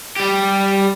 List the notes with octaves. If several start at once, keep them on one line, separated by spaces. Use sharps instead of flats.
G3 G4